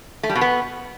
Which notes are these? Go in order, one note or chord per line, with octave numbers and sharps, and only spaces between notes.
A3
G3
B2
B3